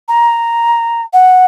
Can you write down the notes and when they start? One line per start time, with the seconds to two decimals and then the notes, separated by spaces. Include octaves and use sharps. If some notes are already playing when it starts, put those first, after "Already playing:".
0.08 A#5
1.13 F#5